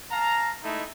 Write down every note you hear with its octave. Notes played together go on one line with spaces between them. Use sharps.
F5 A5 A#5
G#3 A3 D#4 E4